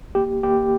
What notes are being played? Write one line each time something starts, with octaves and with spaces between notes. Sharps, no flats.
A#3 G4
A#3 G4